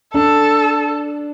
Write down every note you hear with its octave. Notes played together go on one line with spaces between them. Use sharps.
D4 A4